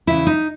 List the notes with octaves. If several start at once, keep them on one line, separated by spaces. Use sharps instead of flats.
E2 C#3 E3 E4
D#4